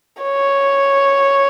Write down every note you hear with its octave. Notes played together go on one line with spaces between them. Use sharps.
C#5